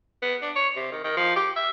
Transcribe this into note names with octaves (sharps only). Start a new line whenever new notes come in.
B3
D4
C#5
C3
D#3
D#3
F3
G4
E5